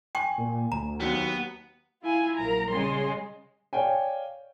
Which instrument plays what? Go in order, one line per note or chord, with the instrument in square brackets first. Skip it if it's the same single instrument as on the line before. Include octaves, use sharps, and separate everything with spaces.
[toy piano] G5 C#6 [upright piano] G#5
[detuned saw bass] A#2
[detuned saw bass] D2 [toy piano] A#5
[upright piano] D#2 F#3 [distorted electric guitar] B3
[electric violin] E4 G#5 [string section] F4
[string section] A#1 F#3 A#4 [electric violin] A#5
[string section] C#3 G3 G#3 [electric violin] C6
[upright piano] C#5 D5 F5 G5 G#5